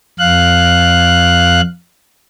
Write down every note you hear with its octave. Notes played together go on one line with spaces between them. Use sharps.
F2 F5 F#6